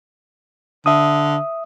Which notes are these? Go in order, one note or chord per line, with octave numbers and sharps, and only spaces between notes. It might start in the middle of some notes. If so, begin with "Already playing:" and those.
D3 E5 D#6